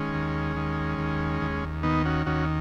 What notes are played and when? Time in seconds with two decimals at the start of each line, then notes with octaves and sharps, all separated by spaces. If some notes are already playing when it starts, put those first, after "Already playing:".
Already playing: D#3 G#3 C#4
0.14 D#2
0.57 D#3
0.99 D#2
1.42 D#2
1.83 D#3 B3 D#4
2.05 C#4 F#4
2.26 D#2 C#4 F#4